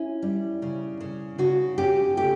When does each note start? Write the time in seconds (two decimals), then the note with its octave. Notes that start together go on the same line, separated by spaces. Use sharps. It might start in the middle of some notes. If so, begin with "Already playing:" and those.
Already playing: C#4 E4
0.22 G3
0.62 C#3
1.01 C#3
1.38 C#3 F#4
1.78 C#4 G4
2.17 A3 G4